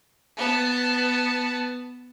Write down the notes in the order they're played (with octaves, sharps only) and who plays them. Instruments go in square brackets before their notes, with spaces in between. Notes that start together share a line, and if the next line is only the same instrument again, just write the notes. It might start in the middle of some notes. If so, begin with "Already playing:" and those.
[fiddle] B3 A5